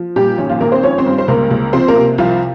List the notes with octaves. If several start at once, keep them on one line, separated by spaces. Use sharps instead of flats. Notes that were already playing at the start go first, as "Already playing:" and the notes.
Already playing: F3
A#2 G3 G4
G#1 C#4
F3 F4
G#1 A#3 A#4
C4 C5
F3 C#4 C#5
C4 C5
G2
C5
C#2 A#3 A#4
C#2
F3 C4 C5
A#3 A#4
C3
C2 F3 F4